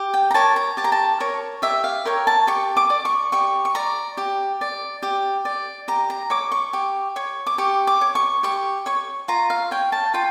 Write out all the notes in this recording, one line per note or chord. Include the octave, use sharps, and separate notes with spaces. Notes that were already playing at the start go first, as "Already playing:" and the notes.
Already playing: G4
G5
A#5
A#4 C#5 A5
A#5
G4 A5
A#5
A5
A#4 C#5
G4 E5
F5
A#4 C#5 G5
A5
G4 C#6
D6
D5
C#6
G4 C#6
C#6
D5 A#5
G4
D5
G4
D5
G4 A#5
A#5
C#5 D6
C#6
G4
C#5
D6
G4 C#6
D6
C#5
C#6
G4 C#6
C#5 C#6
F4 A#5
F5
C#5 G5
A5
F4 G5